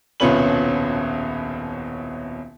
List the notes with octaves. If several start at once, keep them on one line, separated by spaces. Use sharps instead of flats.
D#1 C2 B2 C#4 B4 F#7